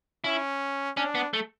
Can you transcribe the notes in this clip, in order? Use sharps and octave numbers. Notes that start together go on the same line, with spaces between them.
C#4 E4
C#4 D4
B3
A3